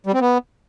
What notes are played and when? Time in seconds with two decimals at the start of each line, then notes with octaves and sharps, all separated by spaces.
0.06 G3
0.14 C4
0.21 B3